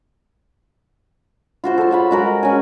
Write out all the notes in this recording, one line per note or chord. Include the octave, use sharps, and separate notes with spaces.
F4 F#4 C5
A4 C6
C#5 F#5 B5
G#3 F#4 A#4
C#4 G#5